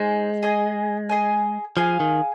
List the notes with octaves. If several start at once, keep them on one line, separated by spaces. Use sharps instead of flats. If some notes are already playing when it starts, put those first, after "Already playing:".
Already playing: G#3 D#4 C5 G#5
G#4 D#5 G#5
G#4 D#5 G#5
F3 G#4 F5 G#5
D#3